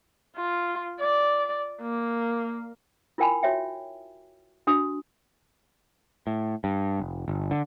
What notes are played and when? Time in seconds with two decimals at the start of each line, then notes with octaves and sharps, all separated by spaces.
0.36 F4
1.00 D5
1.82 A#3
3.18 E4 F4 A#4 G5 G#5 B5
3.43 F#4 C#5 E5 G5
4.67 D4 F#4 D#6
6.27 A2
6.64 G2
7.00 F1
7.28 G1
7.51 D3